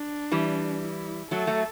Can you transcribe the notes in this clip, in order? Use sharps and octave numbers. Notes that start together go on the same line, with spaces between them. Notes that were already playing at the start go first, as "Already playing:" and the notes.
Already playing: D4
E3 G3
E4
F#3 A3 A4
F#3 A3